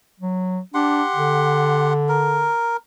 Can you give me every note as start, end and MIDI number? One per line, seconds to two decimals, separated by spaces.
0.20 0.60 54
0.74 1.02 62
0.74 1.93 67
0.74 1.93 78
0.74 1.93 84
1.16 2.49 50
2.09 2.77 70